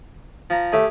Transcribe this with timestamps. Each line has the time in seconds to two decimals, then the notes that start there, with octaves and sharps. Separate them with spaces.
0.50 F3 A#5
0.72 A3 G4 G#4